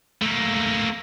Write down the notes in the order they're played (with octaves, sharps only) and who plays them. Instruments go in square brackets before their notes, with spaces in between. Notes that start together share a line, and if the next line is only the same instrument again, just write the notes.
[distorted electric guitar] A3 A#3